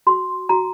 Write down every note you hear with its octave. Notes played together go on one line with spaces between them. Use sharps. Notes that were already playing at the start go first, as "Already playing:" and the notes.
F#4 C6
F#4 A#5